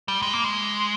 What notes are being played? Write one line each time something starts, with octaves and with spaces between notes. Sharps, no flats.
G3
G#3
A#3
G#3